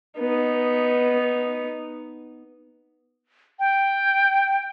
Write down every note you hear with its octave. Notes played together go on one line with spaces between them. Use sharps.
B3 D#4
G5